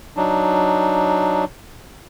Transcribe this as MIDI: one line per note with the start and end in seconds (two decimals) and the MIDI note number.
0.17 1.45 54
0.17 1.45 62
0.17 1.45 63